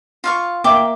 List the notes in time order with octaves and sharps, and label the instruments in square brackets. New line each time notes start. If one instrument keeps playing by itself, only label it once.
[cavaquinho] F4 F5 C#6
[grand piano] A#3 E5 [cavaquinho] G5 D6